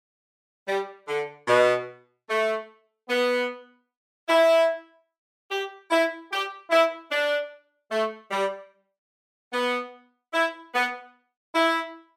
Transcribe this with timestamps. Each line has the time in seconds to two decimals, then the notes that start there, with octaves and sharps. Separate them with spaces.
0.67 G3
1.08 D3
1.48 B2
2.28 A3
3.09 B3
4.29 E4
5.50 G4
5.90 E4
6.31 G4
6.70 E4
7.11 D4
7.91 A3
8.31 G3
9.53 B3
10.33 E4
10.73 B3
11.54 E4